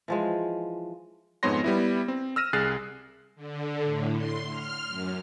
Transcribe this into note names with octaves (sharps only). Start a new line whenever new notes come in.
E3 F3 G#3
F2 G#2 B3 C#5 C6 A#6
G3 B3 E4
C4
E6 F6 A#6 D#7 E7
C2 G#4 F6 F#6 A6 C7
D3
A2
C6
F6
F#2